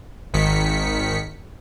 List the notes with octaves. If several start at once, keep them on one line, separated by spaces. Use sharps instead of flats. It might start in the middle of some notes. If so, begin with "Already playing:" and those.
G#1 D#3 B6 C#7